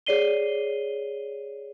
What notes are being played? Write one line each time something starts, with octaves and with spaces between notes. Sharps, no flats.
G#4 C#5 D5 C7 D#7 G7